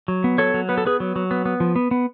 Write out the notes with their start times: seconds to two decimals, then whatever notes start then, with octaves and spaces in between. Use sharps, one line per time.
0.08 F#3
0.24 B3
0.38 F#3 A4 C#5
0.54 F#3
0.69 B3 B4
0.78 A4
0.85 B3 G#4 B4
1.00 F#3
1.16 F#3
1.31 B3
1.46 B3
1.60 F3
1.76 B3
1.91 B3